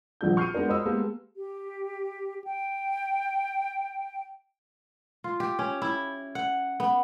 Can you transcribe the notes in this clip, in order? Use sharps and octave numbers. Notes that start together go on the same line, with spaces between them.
D#1 A#1 G2 F#4 G#4 G6
C#6 F6 G6 C7 C#7 D#7
G#3 B3 D4 F#4 G#4 A#4
C5 D#5 B5 D#6 E6
G#3 A#3 B3 G4 A4
G4
G5
F4
G4
C#4
E4
F#5
B3